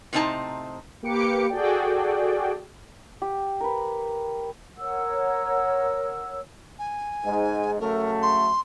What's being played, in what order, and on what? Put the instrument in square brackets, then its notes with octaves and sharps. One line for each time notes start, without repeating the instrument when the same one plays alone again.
[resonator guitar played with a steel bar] A2 C3 C4 D#4 A5 A#5
[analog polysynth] A#3 G4 B4 D6 C#7
F#4 G#4 A4 D5 G5
[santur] G4
A#4 B4
[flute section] A#4 C#5 F#5 E6
[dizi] G#5
[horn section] G#2
[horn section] C#3 F#3 A3 [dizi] A#4
[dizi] C6